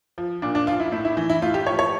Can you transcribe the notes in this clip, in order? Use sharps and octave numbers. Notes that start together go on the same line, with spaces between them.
F3
A#2 D4
D4
F3 F4
E4
A2 E4
E4
E3
E4
A2 F4
G4
F3 C#5
C#5